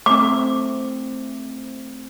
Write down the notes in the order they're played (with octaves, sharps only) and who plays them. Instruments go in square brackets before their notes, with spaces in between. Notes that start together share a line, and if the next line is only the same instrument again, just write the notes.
[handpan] A3 C4 [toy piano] D6